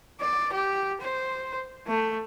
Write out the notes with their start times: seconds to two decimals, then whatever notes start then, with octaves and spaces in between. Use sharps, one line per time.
0.21 D5
0.52 G4
1.01 C5
1.87 A3